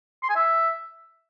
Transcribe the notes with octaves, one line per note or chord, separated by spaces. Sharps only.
C6
G#5
E5